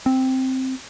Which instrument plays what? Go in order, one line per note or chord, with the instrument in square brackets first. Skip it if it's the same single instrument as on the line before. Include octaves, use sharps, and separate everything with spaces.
[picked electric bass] C4